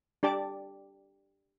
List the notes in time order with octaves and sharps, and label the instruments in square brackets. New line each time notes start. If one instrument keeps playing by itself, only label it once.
[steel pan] D4 G4 D5 A5 D6